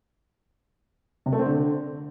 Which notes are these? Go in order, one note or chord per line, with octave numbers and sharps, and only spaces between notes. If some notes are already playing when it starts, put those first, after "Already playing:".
C3
A3
C4
D3